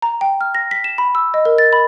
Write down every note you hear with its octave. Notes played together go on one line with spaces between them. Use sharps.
A#5
G5
F6
A#6
B6
E7
B5
E6
D#5
A#4
A6
B5